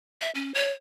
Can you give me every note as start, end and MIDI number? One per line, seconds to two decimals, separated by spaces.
0.21 0.31 76
0.35 0.54 61
0.54 0.71 73